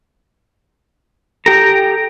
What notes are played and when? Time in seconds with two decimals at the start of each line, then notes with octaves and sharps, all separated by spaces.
1.46 G4 A4 G5 A#5